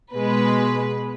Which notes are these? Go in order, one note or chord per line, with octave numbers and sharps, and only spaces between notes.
B2 G#3 B4